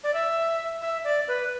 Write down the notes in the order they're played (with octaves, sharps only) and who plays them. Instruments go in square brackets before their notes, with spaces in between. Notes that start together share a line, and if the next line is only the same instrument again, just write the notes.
[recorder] D5
E5
E5
D5
B4